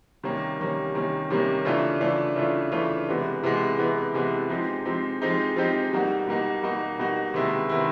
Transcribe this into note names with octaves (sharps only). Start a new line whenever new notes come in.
C3 D#3 G3 A#3 C#4
C3 D#3 G3 A#3 C#4
C3 D#3 G3 A#3 C#4
C3 D#3 G3 A#3 C#4
C#3 E3 A3 D4 F4
C#3 E3 A3 D4 F4
C#3 E3 A3 D4 F4
C#3 E3 A3 D4 F4
C3 E3 G#3 B3
C3 E3 G#3 B3
C3 E3 G#3 B3
C3 E3 G#3 B3
F3 G#3 C4 D#4 G4
F3 G#3 C4 D#4 G4
F3 G#3 C4 D#4 G4
F3 G#3 C4 D#4 G4
B2 G3 A#3 D#4 F#4
B2 G3 A#3 D#4 F#4
B2 G3 A#3 D#4 F#4
B2 G3 A#3 D#4 F#4
C3 D#3 G#3 B3 E4
C3 D#3 G#3 B3 E4